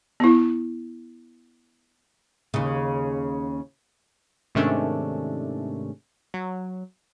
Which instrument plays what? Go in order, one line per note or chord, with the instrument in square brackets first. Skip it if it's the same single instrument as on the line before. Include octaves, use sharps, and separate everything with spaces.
[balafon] B3 E4
[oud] D#2 C#3
[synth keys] G#2 C3 D#3 A3 C#4 D4
F#3